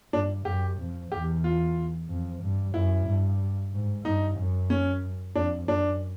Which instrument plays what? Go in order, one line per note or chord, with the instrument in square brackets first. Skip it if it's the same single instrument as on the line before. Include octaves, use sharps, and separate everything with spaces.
[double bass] G2 [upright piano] D4
[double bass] F#2 [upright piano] G4
[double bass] F2
[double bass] E2 [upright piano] G4
[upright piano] F4
[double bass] F2
G2
[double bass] F#2 [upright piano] E4
[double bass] G2
G#2
[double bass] G2 [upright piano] D#4
[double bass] F#2
[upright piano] C#4
[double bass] F2 [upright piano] D4
[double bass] F#2 [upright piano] D4